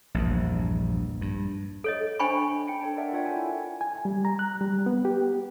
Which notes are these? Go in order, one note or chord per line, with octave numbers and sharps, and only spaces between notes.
A#1 E2 G2
G2
A4 C#5 D#5
D4 C5 G5 G#5 B5 C#6
D4 G5 C#7 D7
A4 C#5 A5
A#4 D5 E5 F#5
F4 A4 C#5 E5 G5
G5 G#5
E4
G#5
G3
A#5
F#6
G3
B3
G4